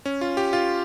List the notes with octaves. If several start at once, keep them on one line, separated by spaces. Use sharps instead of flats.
C#4
F4
G4
F4